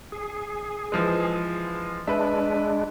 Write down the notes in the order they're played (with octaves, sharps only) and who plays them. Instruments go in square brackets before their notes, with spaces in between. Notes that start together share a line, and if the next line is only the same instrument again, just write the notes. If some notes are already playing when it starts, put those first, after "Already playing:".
[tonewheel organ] G#4
[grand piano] E3 F3 G#3
[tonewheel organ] G#3 D4 [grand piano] B4 E5